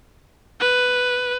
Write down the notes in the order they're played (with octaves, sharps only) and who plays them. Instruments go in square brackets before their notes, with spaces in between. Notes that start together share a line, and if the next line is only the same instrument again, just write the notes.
[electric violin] B4